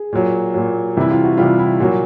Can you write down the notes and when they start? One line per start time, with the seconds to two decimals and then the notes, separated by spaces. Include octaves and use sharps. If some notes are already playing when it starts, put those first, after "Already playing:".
Already playing: G#4
0.13 A#2 F#3
0.54 A#2 F#3
0.96 C3 E3 G3 E4
1.11 F4
1.23 F#4
1.37 C3 E3 G3 F4
1.59 E4
1.79 A#2 F#3 F#4